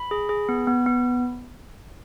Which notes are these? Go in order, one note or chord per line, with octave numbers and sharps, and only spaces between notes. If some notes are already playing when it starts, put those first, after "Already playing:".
Already playing: B5
G#4
G#4
B3
B3
B3